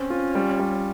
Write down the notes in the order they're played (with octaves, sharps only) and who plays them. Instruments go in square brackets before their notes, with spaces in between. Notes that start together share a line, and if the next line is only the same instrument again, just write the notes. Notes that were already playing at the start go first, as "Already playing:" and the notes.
Already playing: [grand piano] C4 [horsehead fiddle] C#4
[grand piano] F4
G3
G3